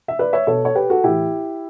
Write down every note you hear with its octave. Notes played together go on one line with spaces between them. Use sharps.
E5
B4 D5
C#5 E5
B2 A4 C#5
C#5
G4 B4
F#4 A4
A2 E3 E4 G4